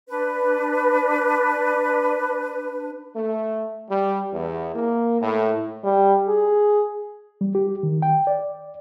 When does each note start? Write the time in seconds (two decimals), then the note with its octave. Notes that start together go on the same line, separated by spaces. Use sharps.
0.08 D4 B4
3.16 A3
3.90 G3
4.33 E2
4.74 A#3
5.21 A2
5.84 G3
6.28 G#4
7.41 G3
7.55 G4
7.83 D#3
8.02 G5
8.27 D5